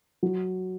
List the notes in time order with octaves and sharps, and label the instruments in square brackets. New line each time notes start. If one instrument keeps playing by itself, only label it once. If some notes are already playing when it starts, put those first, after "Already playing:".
[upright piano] F#3